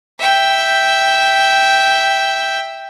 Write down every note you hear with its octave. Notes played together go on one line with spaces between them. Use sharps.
E5 G5